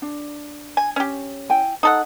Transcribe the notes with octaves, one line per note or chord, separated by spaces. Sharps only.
D4
G#5
C#4 G4
E4 G5 G#5
D#4 A4 F#5 A#5